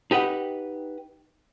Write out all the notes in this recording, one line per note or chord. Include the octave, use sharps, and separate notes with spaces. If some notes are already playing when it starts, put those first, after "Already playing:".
D#4 G4 B4 F#5